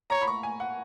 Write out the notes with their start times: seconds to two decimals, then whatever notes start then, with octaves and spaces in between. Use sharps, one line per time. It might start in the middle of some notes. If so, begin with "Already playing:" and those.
0.10 C#5 A#5
0.22 B5
0.27 C#6
0.43 G#5
0.60 F#5